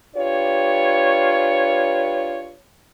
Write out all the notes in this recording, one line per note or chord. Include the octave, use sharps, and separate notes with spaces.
D4 F4 G4 B4 C#5